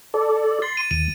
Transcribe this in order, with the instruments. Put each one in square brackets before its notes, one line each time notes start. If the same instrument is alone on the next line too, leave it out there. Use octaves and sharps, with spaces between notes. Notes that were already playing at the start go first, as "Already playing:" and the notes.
[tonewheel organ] A4 D5
[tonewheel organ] C6 [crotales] A6
[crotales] D#7
[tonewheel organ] D#2 [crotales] D#7